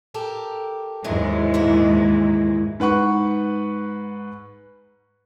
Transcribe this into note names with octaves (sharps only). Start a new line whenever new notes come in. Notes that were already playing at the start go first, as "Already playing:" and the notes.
G4 A4 A#4
D#2 G#2 F#3 G#3 E4 A#4
A#2 E3 E4
G#2 B4 F#5 C#6